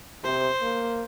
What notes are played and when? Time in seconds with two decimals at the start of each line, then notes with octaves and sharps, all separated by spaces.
0.24 C3 C5
0.62 A#3